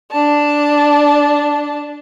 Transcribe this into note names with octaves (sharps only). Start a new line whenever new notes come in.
D4 A5